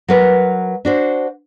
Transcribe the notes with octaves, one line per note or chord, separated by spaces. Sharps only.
F#3 A#4 B4
D4 F#4 C5